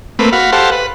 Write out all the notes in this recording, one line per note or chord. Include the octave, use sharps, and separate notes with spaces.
A3 A#3 C4 B4
F#4 F5 B5
G4 A4 C5 F5 F#5
B4